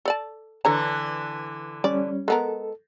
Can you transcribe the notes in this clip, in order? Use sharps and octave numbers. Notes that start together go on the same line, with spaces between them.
A4 D5 A5
D3 E3 A4 C#5 A#5
G3 C#4 D5
G#3 B3 A4 A#4